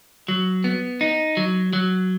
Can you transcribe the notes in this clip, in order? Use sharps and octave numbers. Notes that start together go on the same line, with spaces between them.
F#3
B3
D#4
F#3
F#3